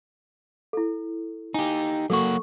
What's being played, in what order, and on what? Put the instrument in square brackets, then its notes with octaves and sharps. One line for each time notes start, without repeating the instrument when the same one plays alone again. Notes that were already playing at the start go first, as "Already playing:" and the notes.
[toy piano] E4 A4
[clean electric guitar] D#4 G4 [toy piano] G#5
[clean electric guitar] F#3 A#3 F#4 [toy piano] A4 C#6